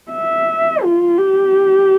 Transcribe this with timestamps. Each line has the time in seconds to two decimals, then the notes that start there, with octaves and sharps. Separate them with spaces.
0.12 E5
0.83 F4
1.19 G4